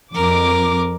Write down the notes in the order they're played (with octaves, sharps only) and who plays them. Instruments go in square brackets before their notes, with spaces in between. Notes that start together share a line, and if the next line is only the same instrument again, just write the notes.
[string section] F2 D6 [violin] A#4